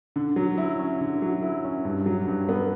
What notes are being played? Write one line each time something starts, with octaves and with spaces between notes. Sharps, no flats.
D3
F#3
E4
C#4
D3
F#3
E4
C#4
G2
F#3
G2
B3